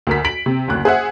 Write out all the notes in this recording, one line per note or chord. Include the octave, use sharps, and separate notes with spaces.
D2 A#4 B6
B6 D7 F#7
C3
F#1 D2 F#6
G#4 C5 E5 F#5